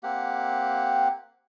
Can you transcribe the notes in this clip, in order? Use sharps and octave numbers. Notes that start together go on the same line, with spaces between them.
A#3 C4 G4 F#5